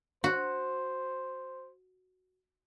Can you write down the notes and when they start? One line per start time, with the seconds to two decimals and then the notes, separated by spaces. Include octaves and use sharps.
0.24 F#4 C5